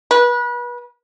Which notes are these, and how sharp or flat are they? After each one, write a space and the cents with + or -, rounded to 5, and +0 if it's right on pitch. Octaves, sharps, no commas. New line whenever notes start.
B4 -30